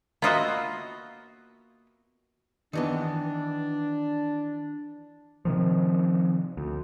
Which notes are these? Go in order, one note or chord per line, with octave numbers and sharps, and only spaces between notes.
A#3 B3 F4 F#4 D#5 E5
D#3 E3 B3 D4
C3 D#3 F3
D2